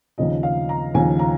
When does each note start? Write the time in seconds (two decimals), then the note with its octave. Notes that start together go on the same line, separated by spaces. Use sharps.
0.18 D#2 C#3 F3 D#5
0.43 F5
0.69 A#5
0.94 D#2 C#3 F3 G#5
1.19 A#5